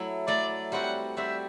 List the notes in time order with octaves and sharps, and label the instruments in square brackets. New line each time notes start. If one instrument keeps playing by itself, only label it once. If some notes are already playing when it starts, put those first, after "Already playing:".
Already playing: [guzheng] F#3 A3 E4
[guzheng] F#3 A3 E4 [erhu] D5
[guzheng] G3 C4 F#4 [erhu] F#5
[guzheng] G3 C4 F#4 [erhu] E5